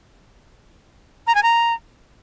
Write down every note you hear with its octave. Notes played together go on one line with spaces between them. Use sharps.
A#5
G#5
A#5